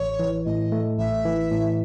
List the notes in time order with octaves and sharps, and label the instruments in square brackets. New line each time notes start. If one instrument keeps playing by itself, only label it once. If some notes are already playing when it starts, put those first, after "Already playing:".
Already playing: [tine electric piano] A1 [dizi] C#5
[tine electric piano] E3
[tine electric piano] A2 [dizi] D#5
[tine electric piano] A3
[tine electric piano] A1 [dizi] E5
[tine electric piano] E3
A2